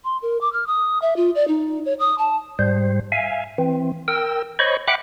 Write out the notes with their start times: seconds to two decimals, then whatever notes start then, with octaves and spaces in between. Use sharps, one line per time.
0.04 C6
0.22 A#4
0.41 D6
0.53 F6
0.67 D#6
1.02 E5
1.17 F4
1.35 D5
1.48 D#4
1.86 C#5
1.99 D#6
2.18 A5
2.59 G#2 G3 C5
3.12 E5 F5 G#5
3.58 E3 C4
4.08 A#4 G5 E6
4.59 C5 C#5 D#5 B5 C#6
4.88 E5 F#5 G5 B5 D6 F#6